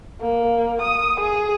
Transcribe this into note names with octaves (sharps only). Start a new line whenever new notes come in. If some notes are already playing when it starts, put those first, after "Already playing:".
A#3
D#6
G#4